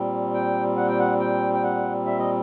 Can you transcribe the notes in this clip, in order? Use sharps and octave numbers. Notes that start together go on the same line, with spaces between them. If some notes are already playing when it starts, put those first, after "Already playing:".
Already playing: A#2 G3 C4
G5
F#5
G5
F#5
G5
G5
F#5
E5
D#5